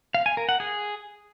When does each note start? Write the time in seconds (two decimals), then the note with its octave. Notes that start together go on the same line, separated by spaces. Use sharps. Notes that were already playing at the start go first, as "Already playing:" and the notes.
0.14 F5
0.26 G#5
0.37 A#4
0.49 F#5
0.60 G#4